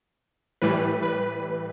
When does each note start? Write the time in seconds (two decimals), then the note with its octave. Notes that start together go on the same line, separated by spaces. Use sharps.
0.62 A2 E3 G3 B4
1.03 B4